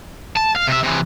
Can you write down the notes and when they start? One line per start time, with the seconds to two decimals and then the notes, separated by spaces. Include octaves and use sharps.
0.37 A5
0.56 F5
0.68 C3 E5
0.84 C3 E3